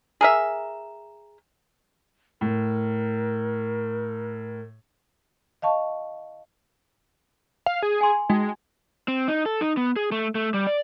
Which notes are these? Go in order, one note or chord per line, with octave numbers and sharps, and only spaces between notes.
G#4 A#4 E5
A2 A#4
D#5 F5 A5 C#6
F5
G#4
G#5 C6
G#3 D#4 F#4 G5
C4
D#4
A4
D#4
B3
G#4
A3
A3
G3
D5